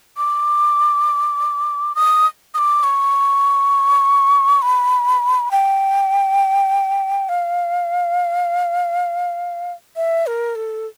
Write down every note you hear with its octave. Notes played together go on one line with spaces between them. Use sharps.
D6
D#6
D#6
D6
C#6
B5
G5
F5
E5
A#4
A4